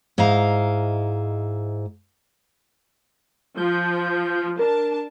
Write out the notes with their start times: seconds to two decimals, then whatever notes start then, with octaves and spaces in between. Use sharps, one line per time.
0.18 G#2 E4 D#5 F5 A#5
3.57 F3 G6
4.59 D4 A#4 A5